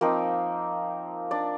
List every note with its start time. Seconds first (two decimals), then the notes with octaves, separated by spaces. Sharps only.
0.01 F3 A#3 C4 D#4 A#4
1.31 D4 D5